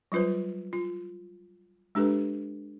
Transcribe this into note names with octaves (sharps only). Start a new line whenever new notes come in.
F#3 G3 F4 B4 C5
F4
G#3 D4 G4 A4 B4